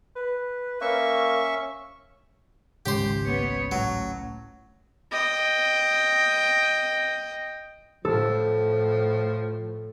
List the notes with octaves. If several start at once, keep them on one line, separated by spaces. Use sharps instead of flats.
B4
A#3 C#4 E5 C#6
G#1 C#2 C#4 G4 C5
B3 C#5
A2 F#3
D#5 G5
A2 F3 A4